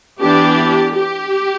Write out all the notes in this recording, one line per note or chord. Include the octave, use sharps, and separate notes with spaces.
E3 B3 D4 G4
G4